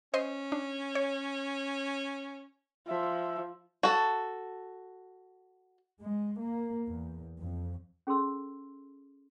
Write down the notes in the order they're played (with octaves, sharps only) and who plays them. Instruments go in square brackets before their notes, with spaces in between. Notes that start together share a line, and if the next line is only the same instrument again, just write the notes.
[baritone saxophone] C#4 [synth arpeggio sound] C5 D#5 C6
[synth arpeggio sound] D4
C#5
[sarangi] F3 [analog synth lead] E5
[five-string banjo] F#4 A4
[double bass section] G#3
A#3
E2
F2
[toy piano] C#4 G#4 A4 C6 E6